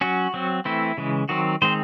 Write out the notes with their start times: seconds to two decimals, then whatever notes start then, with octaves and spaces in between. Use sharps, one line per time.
0.01 F#3 C#4 F#4
0.34 F#3 C4
0.65 E3 A3 C4 E4
0.98 C#3 E3 G#3
1.29 D#3 F#3 C4 F#4
1.62 D#3 G#3 C4 C5